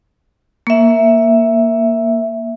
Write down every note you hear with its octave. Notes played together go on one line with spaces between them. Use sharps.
A#3 E5